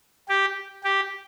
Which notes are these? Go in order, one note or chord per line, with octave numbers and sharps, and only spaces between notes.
G4
G4